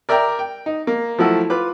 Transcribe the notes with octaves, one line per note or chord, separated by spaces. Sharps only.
A#4 D5 E5 G5 A#5
G5
D#4
A#3
F3 F#3 A3 E4 F#4 A4
F4 B4 D6